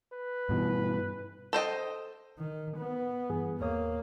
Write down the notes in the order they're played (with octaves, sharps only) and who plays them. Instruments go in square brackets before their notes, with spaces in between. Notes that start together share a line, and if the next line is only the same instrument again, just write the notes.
[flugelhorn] B4
[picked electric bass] G2 B2 E3
[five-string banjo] A4 C5 D#5 G5
[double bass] D#3
B3
[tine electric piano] G2 E3 G#4
[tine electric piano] D#2 C#5 D#6 [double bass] A#3